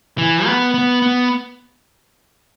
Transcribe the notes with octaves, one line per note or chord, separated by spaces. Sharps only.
E3
B3
B3
B3